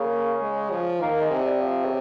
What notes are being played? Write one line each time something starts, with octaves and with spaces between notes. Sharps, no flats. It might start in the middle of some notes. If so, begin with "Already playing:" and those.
Already playing: C#3 A#3
G#3
F3
D#3 A#3
G#3
C3
G3
F3
C#3